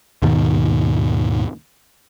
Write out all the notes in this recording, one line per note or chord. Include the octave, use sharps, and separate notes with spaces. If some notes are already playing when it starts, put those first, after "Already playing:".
D#2 G#2 B2 D#3